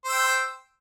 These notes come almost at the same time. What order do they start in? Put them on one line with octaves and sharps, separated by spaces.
C5 E6 G5